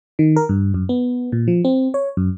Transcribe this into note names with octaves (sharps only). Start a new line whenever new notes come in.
D#3
A#4
G2
F#2
B3
A#2
F3
C4
C#5
F#2